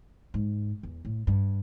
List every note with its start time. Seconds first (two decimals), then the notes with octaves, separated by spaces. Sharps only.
0.34 G#2
0.83 E2
1.05 A2
1.27 G2